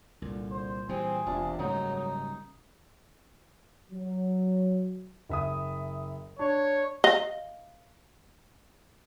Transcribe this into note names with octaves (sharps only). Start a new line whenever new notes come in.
C2 A#2 D3
C5
A#2 E3 G3 C4 G#4
E1 C3 D4 F4 A5
F#1 G#2 C#3 F#3 G3 D#4
D#4
F#3
F#1 E5 D#6
D4 C#5
D#5 F5